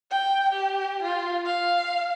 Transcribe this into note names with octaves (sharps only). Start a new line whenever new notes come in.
G5
G4
F4
F5